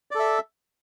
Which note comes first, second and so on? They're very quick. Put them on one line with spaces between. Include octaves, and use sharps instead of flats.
D5 A4 E5